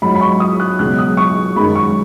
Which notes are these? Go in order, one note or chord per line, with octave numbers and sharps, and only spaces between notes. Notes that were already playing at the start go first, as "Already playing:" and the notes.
G#2 F#3 B5
B5
C#6
D#6
F#6
C#2 B2 F#3 F#6
D#6
C#6
F#2 D#3 G#3 B5
C#6